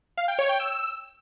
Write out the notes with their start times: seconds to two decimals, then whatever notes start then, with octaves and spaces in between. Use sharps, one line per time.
0.17 F5
0.28 G5
0.39 C#5
0.49 G5
0.60 E6